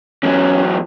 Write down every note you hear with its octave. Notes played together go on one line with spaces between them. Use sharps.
E2 F#3 C#4